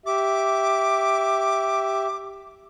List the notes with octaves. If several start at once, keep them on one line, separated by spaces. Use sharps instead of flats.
G4 E5 D6